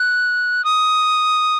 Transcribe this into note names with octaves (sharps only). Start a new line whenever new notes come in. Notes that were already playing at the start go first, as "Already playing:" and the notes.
Already playing: F#6
D#6